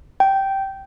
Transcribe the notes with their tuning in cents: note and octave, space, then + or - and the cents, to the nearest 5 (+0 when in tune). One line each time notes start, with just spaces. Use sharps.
G5 -10